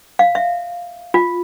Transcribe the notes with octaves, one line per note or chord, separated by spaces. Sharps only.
F5
E5
F4